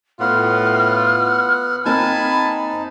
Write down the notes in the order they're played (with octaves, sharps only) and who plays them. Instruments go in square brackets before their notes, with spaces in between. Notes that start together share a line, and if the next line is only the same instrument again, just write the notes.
[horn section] A2 F4 [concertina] B3 F#5 [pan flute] F6
[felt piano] A#3 C4 [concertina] D#4 [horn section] G#5 A5 B5